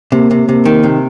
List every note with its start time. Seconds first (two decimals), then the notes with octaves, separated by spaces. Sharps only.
0.12 C3 A#3
0.31 C3
0.47 C3 A#3
0.65 D#3
0.84 C3